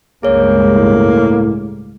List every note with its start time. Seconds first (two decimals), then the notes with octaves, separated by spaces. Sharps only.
0.23 C#2 G2 G#3 A#3 G#4 C#5
0.75 A2